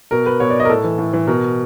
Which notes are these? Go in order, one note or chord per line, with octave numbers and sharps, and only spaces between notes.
B2 A#4
B4
B2 C#5
D5
D#5
A#4
A2 A4
E3
A2
E3
B2 A#4